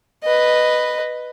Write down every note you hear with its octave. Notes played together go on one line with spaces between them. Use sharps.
B4 D#5